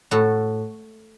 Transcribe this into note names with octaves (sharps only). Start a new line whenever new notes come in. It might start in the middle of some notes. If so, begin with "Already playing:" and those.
A2 F#4 A4